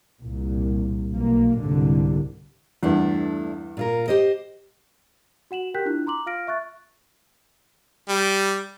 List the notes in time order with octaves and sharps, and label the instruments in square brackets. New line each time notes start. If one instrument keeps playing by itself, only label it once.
[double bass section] C2 A#2
B1 A#3
C2 G#2 D3
[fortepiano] E2 G2 [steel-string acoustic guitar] A3 D4 E4
[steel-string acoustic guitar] A#2 F4 A#4
G4 C5 D#5
[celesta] F#4 F#5 E7 F#7
G4 A#4 G5 F#6 G6 B6
D4 E4 F4 F#6
A#5 C6 D6 F#7
F4 F5 F6 A#6 D7
E5 C#6 F#6 A6
[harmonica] G3